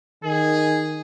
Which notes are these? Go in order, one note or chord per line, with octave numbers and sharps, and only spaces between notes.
D#3 G#4